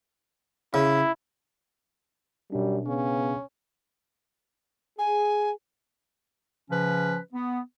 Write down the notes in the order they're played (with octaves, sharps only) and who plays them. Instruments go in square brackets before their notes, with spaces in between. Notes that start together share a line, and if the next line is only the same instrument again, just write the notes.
[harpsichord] C#3 [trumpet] E4
[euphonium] F#2 [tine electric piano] B2 D4 [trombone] G3
[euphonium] C#3 [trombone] B3 [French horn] C#4
[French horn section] G#4 [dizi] G#5
[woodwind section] C#3 F3 C#4 B4
B3